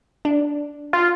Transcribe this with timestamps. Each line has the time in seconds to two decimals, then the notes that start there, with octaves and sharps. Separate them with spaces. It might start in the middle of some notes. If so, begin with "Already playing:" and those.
0.25 D4
0.93 F4